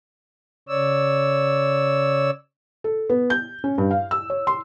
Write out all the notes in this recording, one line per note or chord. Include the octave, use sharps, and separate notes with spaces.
C#3 C#5 D5 E6
A4
B3
G6
C#4
G2
F5
E6
C#5
C6